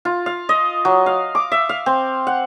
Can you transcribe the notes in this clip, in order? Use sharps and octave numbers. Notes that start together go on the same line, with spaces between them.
F4
F5
D#5
F#3
F5
D6
E5
F5
C4
F#5